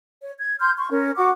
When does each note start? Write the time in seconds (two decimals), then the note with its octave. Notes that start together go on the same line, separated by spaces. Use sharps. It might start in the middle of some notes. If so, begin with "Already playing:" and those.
0.21 C#5
0.39 G#6
0.60 C6 F6 G6
0.77 C6 C#6
0.91 C#4 A#4
1.17 F#4 F#5 C#6 D6